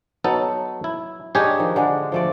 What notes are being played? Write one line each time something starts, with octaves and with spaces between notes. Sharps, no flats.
F#3 B3 D#4 A4
E4
D4 D#4 G4 G#4 C#5 D#5
D#3 F3
D3 G#3 D4
F3 A3 D5